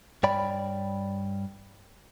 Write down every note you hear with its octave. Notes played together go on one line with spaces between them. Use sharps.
G2 C#5 D5 G5 B5